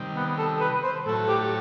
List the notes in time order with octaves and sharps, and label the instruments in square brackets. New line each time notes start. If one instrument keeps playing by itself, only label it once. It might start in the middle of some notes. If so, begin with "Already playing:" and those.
Already playing: [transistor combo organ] C3 D#3 G3
[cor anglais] B3
A4
B4
C5
[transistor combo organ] A2 F#3 A3 [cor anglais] A4
[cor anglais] G4